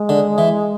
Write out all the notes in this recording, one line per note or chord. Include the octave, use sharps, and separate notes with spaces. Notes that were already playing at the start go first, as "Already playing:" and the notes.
Already playing: G#3
D3
E3